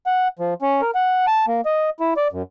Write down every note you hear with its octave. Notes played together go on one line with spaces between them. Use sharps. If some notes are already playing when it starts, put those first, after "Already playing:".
F#5
F3
C#4
A#4
F#5
A5
A#3
D#5
E4
D5
F#2